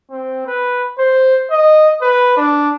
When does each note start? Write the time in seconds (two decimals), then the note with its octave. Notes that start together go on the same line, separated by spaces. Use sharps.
0.11 C4
0.47 B4
0.99 C5
1.51 D#5
2.02 B4
2.37 D4